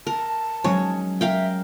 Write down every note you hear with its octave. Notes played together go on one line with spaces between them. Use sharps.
A#4 A5
F#3 G#3 C#4 C#5
A#4 E5 F5 G5